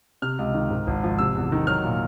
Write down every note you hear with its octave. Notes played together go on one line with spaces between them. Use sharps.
C3 F6
C#2
D#3
G#2
G#1
F3
C3 E6
E2
D#3
F#3 F6
A#2